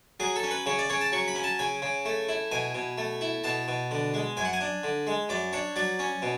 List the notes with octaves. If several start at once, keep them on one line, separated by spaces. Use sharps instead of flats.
F#3 G#4
A4
C#4
B4
C#3 C#5
D5
C#3 C#5
A5
F#3 C#6
B5
C#4
A5
C#3 G#5
C#3
A3
E4
B2 G#5
B2
A3
E4
B2 A5
B2
D3
G#3
F#2 G#5
F#5
G#5
D4
D3
G#3
F#2 D5
D4 C#5
F#3 D5
C#4
B2